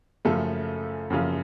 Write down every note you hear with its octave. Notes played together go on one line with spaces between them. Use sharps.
F#2 C#3 F3 A3 A4
F#2 C#3 F3